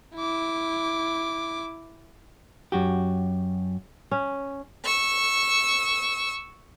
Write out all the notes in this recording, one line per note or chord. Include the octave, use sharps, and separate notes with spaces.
E4 D6
F#2 F#4 G4
C#4
C#6 E6